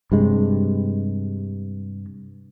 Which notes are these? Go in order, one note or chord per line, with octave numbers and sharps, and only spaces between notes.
G2 C3 G#3